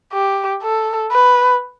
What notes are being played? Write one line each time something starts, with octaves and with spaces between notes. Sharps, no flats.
G4
A4
B4